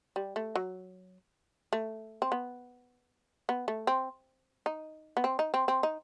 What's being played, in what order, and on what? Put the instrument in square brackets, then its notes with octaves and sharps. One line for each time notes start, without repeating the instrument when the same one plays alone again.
[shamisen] G3
A3
F#3
A3
C4
B3
B3
A3
C4
D#4
B3
C4
D#4
C4
C4
D#4